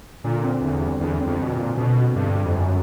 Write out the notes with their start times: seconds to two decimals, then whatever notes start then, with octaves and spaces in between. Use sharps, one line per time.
0.24 A#2 D3
0.43 C4
0.62 E2 D3
0.82 G3
1.01 E2 D3
1.20 C4
1.27 F2
1.40 B2 D3
1.53 A#2
1.59 G3
1.77 B2 D3
1.97 C4
2.16 G2 D3
2.36 G3
2.45 F2
2.55 F#2 D3